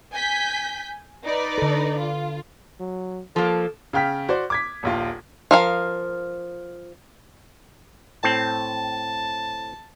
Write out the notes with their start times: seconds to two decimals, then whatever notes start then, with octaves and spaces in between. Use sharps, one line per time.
0.13 G#5 G6 B6
1.25 D#4 B4 D5
1.58 D3 A4
1.99 F4
2.80 F#3
3.36 F3 A#3 A4
3.93 C#3 F5 G5 F6 B6
4.29 F#4 C5 D5
4.50 D6 G#6 B6
4.83 D#1 A#1 F4
5.51 F3 A#4 F5
8.24 A2 C4 A5